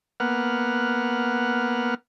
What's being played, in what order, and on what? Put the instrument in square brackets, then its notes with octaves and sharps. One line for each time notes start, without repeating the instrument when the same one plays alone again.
[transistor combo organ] A#3 B3 F#5 F6